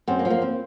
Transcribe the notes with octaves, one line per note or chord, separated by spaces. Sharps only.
F#2 C4
A#3
F3
A#3
C4